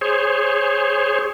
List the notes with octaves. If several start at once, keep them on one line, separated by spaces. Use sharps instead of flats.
G#4 C5 C#5